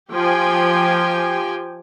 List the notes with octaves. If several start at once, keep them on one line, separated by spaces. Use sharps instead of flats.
F3 G4 G5 G#5